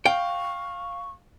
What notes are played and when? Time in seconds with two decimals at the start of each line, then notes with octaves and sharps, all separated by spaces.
0.06 F5 G5 C#6